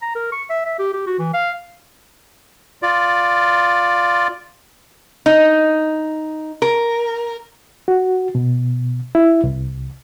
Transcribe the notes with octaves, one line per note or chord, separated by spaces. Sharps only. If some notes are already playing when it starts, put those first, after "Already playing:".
A#5
A#4
C#6
E5
E5
G4
G4
F#4
E3
F5
F4 D5
D#4
A#4
F#4
B2
E4
C2